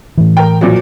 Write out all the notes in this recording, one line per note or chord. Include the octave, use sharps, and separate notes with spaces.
A2 E3
A#4 G5
A#2 F3 F#3